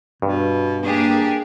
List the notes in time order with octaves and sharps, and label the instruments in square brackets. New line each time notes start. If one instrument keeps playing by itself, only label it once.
[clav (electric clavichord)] G2 [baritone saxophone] B2
[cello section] A#3 G4 G#4 [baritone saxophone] D4